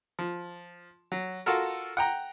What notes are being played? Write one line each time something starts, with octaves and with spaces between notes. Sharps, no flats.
F3
F#3
F4 F#4 A4 A#4
F#5 G5 A#5